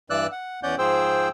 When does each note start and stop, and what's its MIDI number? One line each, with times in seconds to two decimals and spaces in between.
0.10 0.27 43
0.10 0.27 52
0.10 0.27 74
0.10 0.27 88
0.10 0.27 90
0.32 0.60 78
0.63 0.75 40
0.63 0.75 61
0.63 0.75 74
0.63 0.75 78
0.63 0.75 91
0.78 1.29 44
0.78 1.29 53
0.78 1.29 68
0.78 1.29 72
0.78 1.29 79
0.78 1.29 88